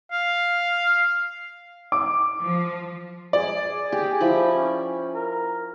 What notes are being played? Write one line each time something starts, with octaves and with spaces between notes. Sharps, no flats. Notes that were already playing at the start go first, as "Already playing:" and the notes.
F5
D6
F3
G#4 D5
G4
F3 E4 B5
C#4
A#4